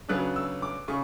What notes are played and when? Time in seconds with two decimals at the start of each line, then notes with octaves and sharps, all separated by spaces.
0.09 C#3 F#3 B3 D4 F#6
0.36 E6
0.62 D6
0.88 C#3 C#6